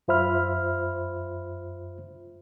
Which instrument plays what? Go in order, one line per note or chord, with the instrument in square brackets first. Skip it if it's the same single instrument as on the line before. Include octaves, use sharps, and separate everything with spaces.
[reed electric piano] F#2 F4 C5 E5 B5 F6